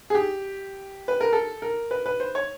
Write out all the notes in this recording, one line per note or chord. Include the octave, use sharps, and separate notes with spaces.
G#4
G4
B4
A#4
A4
A#4
B4
B4
C5
C#5